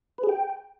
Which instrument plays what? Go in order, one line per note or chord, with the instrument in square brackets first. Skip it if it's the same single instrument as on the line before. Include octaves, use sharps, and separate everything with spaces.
[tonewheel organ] B4
G#4
G5